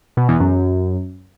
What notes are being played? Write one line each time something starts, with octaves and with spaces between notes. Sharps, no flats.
B2
E2
F#2